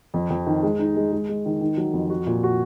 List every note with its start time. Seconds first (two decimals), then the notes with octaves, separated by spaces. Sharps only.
0.14 F2
0.30 F2
0.47 D#3
0.63 G#3
0.79 D#4
0.96 G#3
1.12 G#3
1.29 G#3
1.46 D#3
1.61 D#3
1.77 F#3
1.93 F2
2.10 F#4
2.27 A#2
2.43 F#4